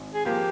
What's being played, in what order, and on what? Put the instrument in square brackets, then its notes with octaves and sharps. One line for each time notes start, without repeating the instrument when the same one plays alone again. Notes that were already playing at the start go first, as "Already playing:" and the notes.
Already playing: [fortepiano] G#1
[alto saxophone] G#4
[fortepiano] F3 A#3 F4 [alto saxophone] G4